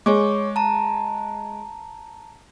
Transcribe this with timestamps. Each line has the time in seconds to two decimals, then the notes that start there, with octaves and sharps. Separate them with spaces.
0.06 G#3 C#5 C#6 D6
0.56 A5 A#5